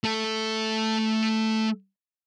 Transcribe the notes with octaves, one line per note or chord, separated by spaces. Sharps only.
A3 A4